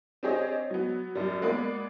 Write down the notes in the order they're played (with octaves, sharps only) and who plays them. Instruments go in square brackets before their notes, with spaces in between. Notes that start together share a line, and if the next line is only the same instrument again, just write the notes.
[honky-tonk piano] C4 D4 G4 G#4 C#5 D#5
F#3 B3
F#2 G3
G#3 A#3 B3 D5 B5